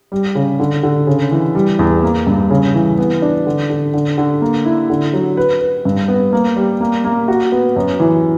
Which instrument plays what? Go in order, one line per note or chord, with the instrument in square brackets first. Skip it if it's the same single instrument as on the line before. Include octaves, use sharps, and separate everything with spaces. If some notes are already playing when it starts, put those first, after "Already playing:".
[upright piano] G3
C#3
D3
D3
C#3
E3
G3
E2
A#3
G2
C#3
E3
B3
D4
D3
D3
D3
D3
A#3
E4
D3
F#3
B4
B4
G2
B3
A#3
G3
A#3
A#3
F#4
B3
F#2
E3